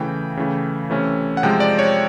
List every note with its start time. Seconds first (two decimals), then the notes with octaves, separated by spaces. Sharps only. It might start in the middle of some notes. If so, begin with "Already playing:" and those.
Already playing: C#3 E3 A3 G5
0.37 C#3 E3 A3
0.90 C3 E3 A3 C#4
1.37 F#5
1.43 C3 F3 G#3 G5
1.60 D5
1.79 C#5